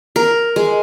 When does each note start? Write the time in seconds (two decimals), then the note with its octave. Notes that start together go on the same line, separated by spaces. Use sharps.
0.16 A#4
0.56 G#3